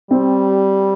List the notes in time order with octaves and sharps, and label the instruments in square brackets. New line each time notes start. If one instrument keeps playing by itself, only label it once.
[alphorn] G3 [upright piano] C4